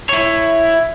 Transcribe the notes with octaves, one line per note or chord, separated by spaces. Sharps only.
E4 C#5